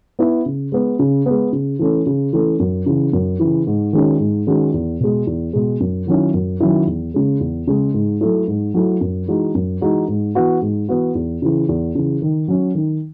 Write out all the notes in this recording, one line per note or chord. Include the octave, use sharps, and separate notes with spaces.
B3 E4
C#3
G#3 B3
C#3
G#3 B3
C#3
E3 A3 C#4
C#3
E3 A3 C#4
F#2
C#3 E3
F#2
C#3 E3
G#2
D#3 G#3 C#4 F#4
G#2
D#3 G#3 C#4 F#4
E2
B2 G#3
E2
B2 G#3
F#2
D#3 F#3 C#4 E4
F#2
D#3 F#3 C#4 E4
E2
C#3 G#3
E2
C#3 G#3
G#2
F#3 A3 E4
G#2
F#3 A3 E4
F#2
E3 G#3 D#4 F#4
F#2
E3 G#3 D#4 F#4
G#2
E3 B3 F#4
G#2
E3 B3 F#4
E2
C#3 E3
E2
C#3 E3
D#3
F#3 C#4
D#3